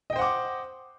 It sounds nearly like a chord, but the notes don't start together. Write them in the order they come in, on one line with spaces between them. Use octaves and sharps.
D#5 G5 C5 F#5 D6